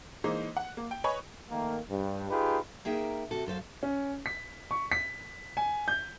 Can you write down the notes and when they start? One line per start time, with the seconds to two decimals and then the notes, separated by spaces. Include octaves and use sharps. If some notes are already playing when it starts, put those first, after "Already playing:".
0.24 E3 G#3 A#3 D#4 C5
0.57 F#5
0.77 A#3
0.91 G5
1.04 B4 C#5 D#5 G#5 B5 C#6
1.50 D#3 A3 A#3
1.90 G2
2.30 D#4 F4 G4 G#4 B4
2.85 A#3 D#4 G#4 A#4 E5 G5
3.31 C3 F#4 A4
3.46 F#2 A4 C5 F5
3.83 C#4
4.26 B6
4.71 C#6
4.92 B6
5.57 G#5
5.88 G6